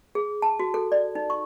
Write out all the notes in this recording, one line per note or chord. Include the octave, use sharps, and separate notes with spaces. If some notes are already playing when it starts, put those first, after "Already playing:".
G#4
A5
F#4
A4
D5
D#4
C#6